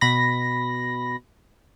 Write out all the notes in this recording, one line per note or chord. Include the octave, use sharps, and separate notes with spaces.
B2 B5 A#6